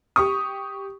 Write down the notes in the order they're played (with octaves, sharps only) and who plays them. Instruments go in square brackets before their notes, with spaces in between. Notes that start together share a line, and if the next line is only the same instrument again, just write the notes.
[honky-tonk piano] G4 C#6 D#6